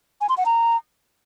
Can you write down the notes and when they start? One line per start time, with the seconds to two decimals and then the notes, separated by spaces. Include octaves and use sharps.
0.21 G#5
0.29 C6
0.37 F#5
0.46 A#5